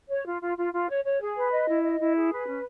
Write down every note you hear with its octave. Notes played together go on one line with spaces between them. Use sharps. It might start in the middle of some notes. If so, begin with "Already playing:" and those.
C#5
F4
F4
F4
F4
C#5
C#5
G#4
B4
D#5
E4
D#5
E4
G#4
B4
C#4